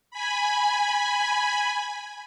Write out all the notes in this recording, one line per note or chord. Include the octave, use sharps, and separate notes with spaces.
G#5 B5